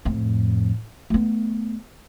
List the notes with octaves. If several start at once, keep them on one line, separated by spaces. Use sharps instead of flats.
F2 A2
A3 B3